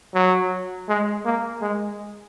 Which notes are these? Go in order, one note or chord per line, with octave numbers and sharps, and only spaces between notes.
F#3
G#3
A#3
G#3